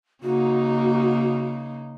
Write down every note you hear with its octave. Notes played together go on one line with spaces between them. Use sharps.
C#3 A#3 D#4 F#4